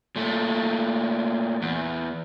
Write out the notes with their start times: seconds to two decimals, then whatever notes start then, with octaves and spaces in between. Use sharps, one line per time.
0.16 A#2 A3
1.62 E2